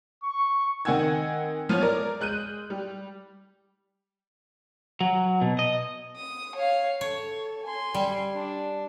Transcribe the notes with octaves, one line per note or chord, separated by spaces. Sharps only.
C#6
D#3 C4 F#5 G#5 E6 G#6
F3 B3 C#5 F6
A#4 D5
G#3 F#6 G6 D#7
G3
F#3
B2
D#5
D#6
C#5 F5
A4 C#5
G#5 C6
G3
D4